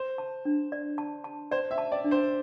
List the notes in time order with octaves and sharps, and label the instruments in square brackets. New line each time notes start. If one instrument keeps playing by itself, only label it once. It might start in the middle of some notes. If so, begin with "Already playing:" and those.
Already playing: [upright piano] C5
[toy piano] A5
D4
D5
A5
A5
[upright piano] C5 [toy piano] D5
[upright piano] E5
[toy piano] A5
[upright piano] D5
[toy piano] D4
[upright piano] C5